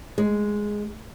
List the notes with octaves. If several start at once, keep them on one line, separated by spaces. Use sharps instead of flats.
G#3